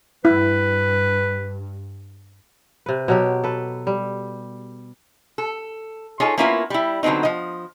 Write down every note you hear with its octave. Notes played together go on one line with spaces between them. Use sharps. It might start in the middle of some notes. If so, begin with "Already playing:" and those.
G2 E4 B4
C3 B4
B2 F#3 G4
A4 B4
G3
A4
D#4 F4 G#4 A4 C#5
A#3 B3 C#4 E4 F4 A#4
G3 E4
D3 F#3 B3 C4 D#4
F3 D#5